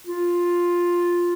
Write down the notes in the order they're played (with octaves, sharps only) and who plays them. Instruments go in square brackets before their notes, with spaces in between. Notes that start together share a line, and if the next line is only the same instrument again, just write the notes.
[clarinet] F4